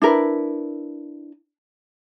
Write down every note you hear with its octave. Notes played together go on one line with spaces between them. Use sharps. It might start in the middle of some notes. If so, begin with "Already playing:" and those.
D4 E4 A#4 B4